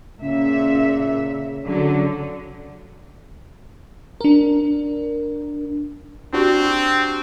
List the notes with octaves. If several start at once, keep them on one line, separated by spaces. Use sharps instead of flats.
A#2 C#3 E5
D3 F#3
D4 A#4
C4 D4 F#4 G4